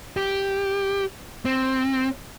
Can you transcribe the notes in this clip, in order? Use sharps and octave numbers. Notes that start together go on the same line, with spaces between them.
G4
C4